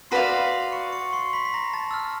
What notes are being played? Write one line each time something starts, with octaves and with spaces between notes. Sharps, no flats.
F#4 B4 D5 F5 C6 C7
C#6 C#7
C#6 C#7
C6 C7
B5 B6
B6
A#5 A#6
A5 A6
E6
F6